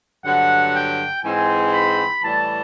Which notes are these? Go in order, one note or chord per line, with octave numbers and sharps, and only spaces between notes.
G2 D3 F#3 F#5
G5
G#2 E3 G#3 C4 G#5
B5
A2 E3 G3 A5